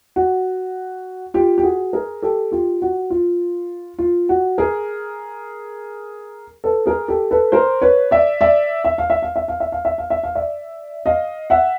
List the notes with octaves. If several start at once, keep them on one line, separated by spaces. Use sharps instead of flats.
F#4
F4 G4
G4
F#4 G#4
G#4 A#4
G4 A4
F4 G4
F#4
F4
F4
F#4
G#4 A#4
A4 B4
G#4 A#4
G4 A4
A4 B4
A#4 C5
B4 C#5
D5 E5
D5 E5
E5
F5
E5
F5
E5
F5
E5
F5
E5
F5
E5
F5
D5 E5
D#5 F5
E5 F#5